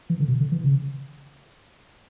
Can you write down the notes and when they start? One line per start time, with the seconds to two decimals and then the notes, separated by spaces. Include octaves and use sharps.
0.10 E3
0.20 D3
0.28 B2
0.41 D3
0.52 E3
0.64 C#3